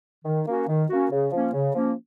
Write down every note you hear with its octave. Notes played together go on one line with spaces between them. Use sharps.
D#3
A#3 C#4 F#4
D#3
A#3 C#4 F#4
C#3
F3 A#3 C#4
C#3
F3 A#3 C#4